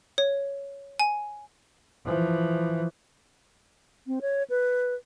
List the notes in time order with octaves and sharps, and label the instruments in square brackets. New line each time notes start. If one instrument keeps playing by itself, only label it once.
[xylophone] C#5
G#5
[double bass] E3 F3
[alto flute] C4
C#5
B4